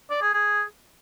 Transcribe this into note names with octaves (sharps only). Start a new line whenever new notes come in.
D5
G#4
G#4